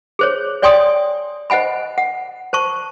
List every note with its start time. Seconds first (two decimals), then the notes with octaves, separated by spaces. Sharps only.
0.19 G#4 C5 C#5
0.62 C#5 D5 G5 G#5 C6 D#6
1.50 C5 D#5 F#5 G#5 B5
1.98 F#5
2.53 C5 A5 C#6